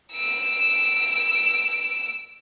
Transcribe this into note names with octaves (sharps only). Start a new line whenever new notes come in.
E6 D7